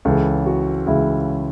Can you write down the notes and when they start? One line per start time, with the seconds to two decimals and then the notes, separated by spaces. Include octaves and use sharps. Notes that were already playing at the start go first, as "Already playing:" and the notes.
0.05 C#2 C#3 E3 A4
0.46 F#4
0.87 C#2 C#3 E3 E4